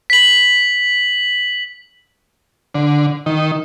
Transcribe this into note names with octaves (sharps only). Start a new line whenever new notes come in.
B6 F#7
D3
D#3